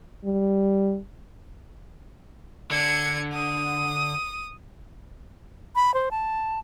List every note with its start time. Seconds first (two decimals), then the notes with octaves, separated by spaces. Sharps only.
0.25 G3
2.71 D3 D4 G#6 C#7
3.33 D#6
5.75 B5
5.94 C5
6.11 A5